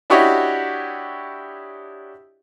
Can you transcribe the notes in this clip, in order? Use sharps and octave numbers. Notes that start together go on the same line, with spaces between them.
D4 E4 F#4 G4 C#5 D#5